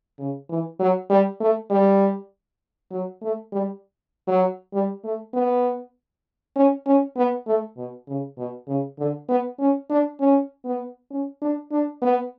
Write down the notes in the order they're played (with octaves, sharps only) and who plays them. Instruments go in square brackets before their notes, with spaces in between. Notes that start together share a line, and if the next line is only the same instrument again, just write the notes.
[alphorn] C#3
E3
F#3
G3
A3
G3
F#3
A3
G3
F#3
G3
A3
B3
C#4
C#4
B3
A3
B2
C#3
B2
C#3
D3
B3
C#4
D4
C#4
B3
C#4
D4
D4
B3